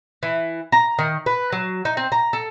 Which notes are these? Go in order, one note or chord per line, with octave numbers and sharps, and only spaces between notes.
E3
A#5
D#3
B4
F#3
D#4
C4
A#5
A4